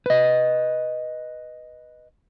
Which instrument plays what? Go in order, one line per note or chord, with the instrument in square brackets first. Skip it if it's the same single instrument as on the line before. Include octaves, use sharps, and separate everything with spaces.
[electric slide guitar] B4 D#5